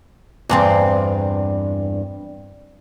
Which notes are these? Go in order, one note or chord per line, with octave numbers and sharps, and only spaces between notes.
E2 G2 C4